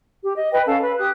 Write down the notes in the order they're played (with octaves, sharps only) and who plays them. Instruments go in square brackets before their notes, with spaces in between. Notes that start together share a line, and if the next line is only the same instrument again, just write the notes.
[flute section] G4
D#5
B4 D#5 G5
C#4 A4 F5 A5
B4
G4 D#6 F#6